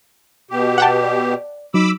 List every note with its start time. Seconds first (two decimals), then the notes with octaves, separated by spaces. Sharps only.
0.51 B2 G4
0.78 F#5 G5 A5
1.03 D5
1.74 F#3 D#4 B5 D6 E6